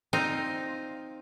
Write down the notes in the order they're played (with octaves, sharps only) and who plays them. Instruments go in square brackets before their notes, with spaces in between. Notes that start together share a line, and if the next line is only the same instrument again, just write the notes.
[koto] C4 D#4 F4